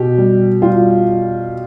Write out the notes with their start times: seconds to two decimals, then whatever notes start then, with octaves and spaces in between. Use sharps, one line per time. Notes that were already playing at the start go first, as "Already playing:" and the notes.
Already playing: B2 G4
0.18 G3
0.62 G3 F4